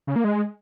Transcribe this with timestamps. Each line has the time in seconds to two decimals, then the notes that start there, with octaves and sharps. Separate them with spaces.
0.07 C#3
0.16 A#3
0.24 G#3